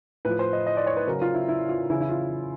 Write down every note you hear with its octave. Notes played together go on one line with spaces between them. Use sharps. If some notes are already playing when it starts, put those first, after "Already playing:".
A2 F3 B4
C5
D#5
D#5
D5
C#5
B4
C#3 F#3 A#4
F4
E4
E4
F4
C#3 E3 E4
E4
F4